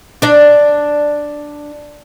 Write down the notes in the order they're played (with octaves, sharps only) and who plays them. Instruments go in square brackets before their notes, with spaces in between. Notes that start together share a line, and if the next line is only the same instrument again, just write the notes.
[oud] D4 D5